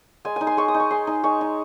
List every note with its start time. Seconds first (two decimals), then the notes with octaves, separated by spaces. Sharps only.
0.25 G#3 G#5
0.36 D#4 G#5
0.47 C6
0.57 G#3 C#6
0.68 D#6
0.74 D#4
0.80 C#6
0.91 G#3 C6
1.07 D#4
1.23 G#3 C#6
1.41 D#4